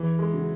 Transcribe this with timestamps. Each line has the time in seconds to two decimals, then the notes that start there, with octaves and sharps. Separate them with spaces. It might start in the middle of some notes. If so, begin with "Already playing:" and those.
Already playing: E2 E3
0.19 G#3
0.33 C#3 F#3 C#4